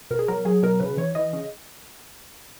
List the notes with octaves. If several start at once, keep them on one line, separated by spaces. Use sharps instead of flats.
B2 A#4
G#4
F#3 A#4
F#3 G#4
B2 A#4
C#3 B4
E3 C#5
E3 D#5
C#3